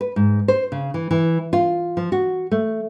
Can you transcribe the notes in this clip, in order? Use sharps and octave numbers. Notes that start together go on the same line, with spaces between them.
B4
G#2
C5
C#3
E3
E3
F4
F3
F#4
A3